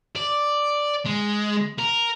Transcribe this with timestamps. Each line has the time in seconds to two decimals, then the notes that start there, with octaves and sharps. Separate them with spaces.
0.16 D5
1.06 G#3
1.79 A#4